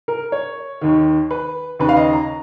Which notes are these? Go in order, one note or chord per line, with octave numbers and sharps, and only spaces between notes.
A#4
C#5
D#2 D#3
B4
D#2 C#3 B4
F5
D#5
A#5